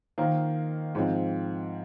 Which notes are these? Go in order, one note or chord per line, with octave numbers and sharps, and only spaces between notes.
D#3 A#3 F4 C5
G#2 F3 C4